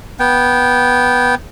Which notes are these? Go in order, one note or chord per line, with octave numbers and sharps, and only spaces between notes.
B3 G5